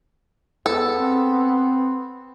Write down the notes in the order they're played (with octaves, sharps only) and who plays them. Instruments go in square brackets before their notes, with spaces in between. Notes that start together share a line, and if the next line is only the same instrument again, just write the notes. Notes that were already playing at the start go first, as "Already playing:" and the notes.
[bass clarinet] E2 [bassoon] B3 [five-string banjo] A4
[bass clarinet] C4